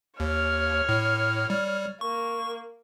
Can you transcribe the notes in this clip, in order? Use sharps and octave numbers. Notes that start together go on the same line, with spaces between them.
D#2 C#5 F6
A2
G3
A#3 C#6